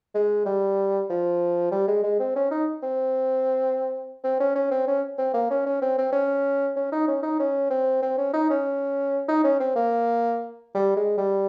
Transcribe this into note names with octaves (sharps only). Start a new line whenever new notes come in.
G#3
G3
F3
G3
G#3
G#3
C4
C#4
D#4
C4
C4
C#4
C#4
C4
C#4
C4
A#3
C#4
C#4
C4
C4
C#4
C#4
D#4
C#4
D#4
C#4
C4
C4
C#4
D#4
C#4
D#4
C#4
C4
A#3
G3
G#3
G3